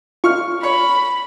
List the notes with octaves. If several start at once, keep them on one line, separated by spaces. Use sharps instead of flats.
F4 C#6 F6
C#5 B5